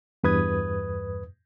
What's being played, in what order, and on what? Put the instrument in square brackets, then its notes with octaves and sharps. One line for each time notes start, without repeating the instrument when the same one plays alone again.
[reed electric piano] E2 G2 B4 D#6 G#6